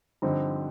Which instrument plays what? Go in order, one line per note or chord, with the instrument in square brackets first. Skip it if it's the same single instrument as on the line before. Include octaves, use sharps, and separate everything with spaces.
[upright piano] G2 D3 F3 C4 D#4